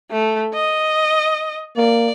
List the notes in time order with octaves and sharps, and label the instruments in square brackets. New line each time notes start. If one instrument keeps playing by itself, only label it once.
[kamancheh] A3
D#5
[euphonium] A#3 [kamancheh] D5